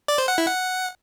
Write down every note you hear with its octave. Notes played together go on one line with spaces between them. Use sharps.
D5
C5
F#5
E4
F#5